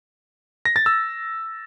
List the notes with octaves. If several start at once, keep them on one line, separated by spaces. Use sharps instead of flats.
A#6
A6
E6